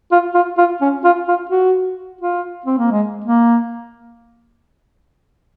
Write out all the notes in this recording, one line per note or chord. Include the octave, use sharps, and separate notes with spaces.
F4
F4
F4
C#4
F4
F4
F#4
F4
C4
A#3
G#3
A#3